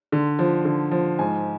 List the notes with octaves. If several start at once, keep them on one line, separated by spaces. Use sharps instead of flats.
D3
F3
D3
F3
G#2 G#5